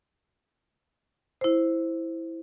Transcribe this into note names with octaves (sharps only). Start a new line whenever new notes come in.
E4 C5